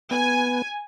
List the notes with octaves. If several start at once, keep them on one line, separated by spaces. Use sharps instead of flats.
B3 G#5